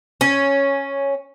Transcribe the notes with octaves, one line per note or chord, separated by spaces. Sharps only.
C#4